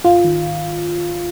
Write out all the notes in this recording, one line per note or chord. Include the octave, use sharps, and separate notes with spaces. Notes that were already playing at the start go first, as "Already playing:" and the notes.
G#1 F4
D#3
G#1